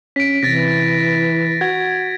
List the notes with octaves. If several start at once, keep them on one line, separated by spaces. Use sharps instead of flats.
C#4 B6 D7
C3 E3 A6 A#6
F#4 G#6